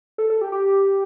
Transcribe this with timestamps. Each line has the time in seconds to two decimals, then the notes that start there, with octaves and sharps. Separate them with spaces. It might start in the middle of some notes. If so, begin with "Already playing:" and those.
0.18 A4
0.30 A4
0.41 G4
0.52 G4